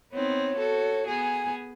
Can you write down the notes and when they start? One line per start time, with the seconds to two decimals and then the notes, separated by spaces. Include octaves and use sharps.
0.12 B3 C4 D#4 C#5
0.57 F#4 A4
1.07 B3 G#4 G#5